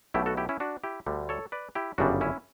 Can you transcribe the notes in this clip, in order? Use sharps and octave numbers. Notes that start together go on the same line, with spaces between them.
B1 B2 A3 E4 G4
F#4 A4
E4 G4
C#4 E4
D4 F#4
E4 G4
D2 D3 G3
A4 C#5
B4 D5
E4 G4
G1 F#2 C#3 G3 D4 F#4
C#4 E4